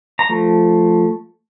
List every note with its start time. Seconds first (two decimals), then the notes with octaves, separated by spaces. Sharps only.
0.19 A#5
0.29 F3 A3